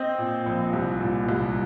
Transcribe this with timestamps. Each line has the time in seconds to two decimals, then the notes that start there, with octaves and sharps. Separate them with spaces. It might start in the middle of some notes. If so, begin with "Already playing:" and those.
Already playing: C4 C5 D#5
0.18 A#2
0.46 A#1
0.73 C2
1.01 A#2
1.29 C2